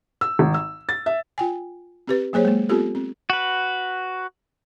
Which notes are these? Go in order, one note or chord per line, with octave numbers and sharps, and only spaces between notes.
E6
G#1
E6
A6
E5
F4 G5 G#5
C4 G4 B4
F#3 A#3 G#4 C5 C#5
G#3 A#3
B3 C4 F4 G4 A4
C4
F#4 B4